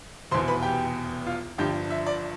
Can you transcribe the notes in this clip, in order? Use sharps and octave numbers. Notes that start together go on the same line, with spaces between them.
F1 E2 B2 C5 C6
B4 B5
G4 G5
F4 F5
G1 G2 F3 G4 G5
E5
D5